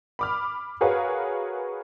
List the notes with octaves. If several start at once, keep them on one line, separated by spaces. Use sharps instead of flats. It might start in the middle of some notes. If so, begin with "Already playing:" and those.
B5 D6 F6
F#4 G#4 A#4 B4 C#5 F5